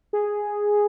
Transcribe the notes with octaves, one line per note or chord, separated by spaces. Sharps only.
G#4